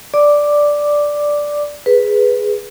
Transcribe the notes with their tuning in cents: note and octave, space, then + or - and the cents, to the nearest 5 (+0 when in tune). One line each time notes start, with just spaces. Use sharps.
D5 +0 D6 +0
G#4 +0 B4 +0